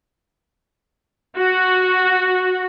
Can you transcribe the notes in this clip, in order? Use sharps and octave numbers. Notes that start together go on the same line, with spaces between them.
F#4